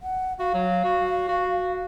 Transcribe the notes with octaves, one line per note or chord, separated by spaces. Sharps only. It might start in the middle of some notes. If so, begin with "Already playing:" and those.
F#5
F#4 F5
F#3
F#4
F#4